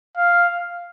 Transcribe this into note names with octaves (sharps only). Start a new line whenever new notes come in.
F5